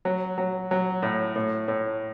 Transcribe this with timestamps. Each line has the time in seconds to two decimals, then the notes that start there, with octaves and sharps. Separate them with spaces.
0.05 F#3
0.38 F#3
0.71 F#3
1.03 A2
1.36 A2
1.68 A2